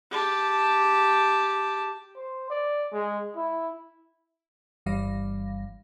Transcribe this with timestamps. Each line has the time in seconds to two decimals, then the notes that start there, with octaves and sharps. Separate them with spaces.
0.11 G4 A5
2.17 C5
2.50 D5
2.93 G#3
3.37 E4
4.86 G1 G2 E3 G3 F5 A#6